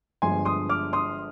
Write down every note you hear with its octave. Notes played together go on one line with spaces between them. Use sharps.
G1 G2 D3 F3 G#3 G#5 C6
C6 D#6
D6 F6
C6 D#6